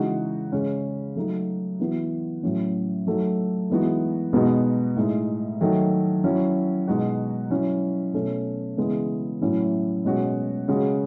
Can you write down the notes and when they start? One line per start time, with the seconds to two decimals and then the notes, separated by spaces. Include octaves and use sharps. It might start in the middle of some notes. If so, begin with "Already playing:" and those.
Already playing: C#3 E3 G#3 D#4 F#4
0.52 C#3 G#3 C#4
1.16 F#3 A3 D#4 F#4
1.80 E3 B3 F#4
2.43 A2 F#3 C#4
3.07 F#3 A3 D#4
3.70 E3 G#3 B3 D#4 F#4
4.33 B2 G#3 B3 D#4 F#4
4.96 A2 G#3 D#4
5.61 D#3 F#3 A3
6.24 F#3 C#4 E4
6.88 B2 G#3 D#4 F#4
7.50 F#3 C#4 E4
8.13 B2 A3 C#4
8.77 C#3 E3 G#3 B3
9.41 A2 F#3 C#4 E4
10.05 B2 G#3 C#4 F#4
10.68 C#3 G#3 C#4 F#4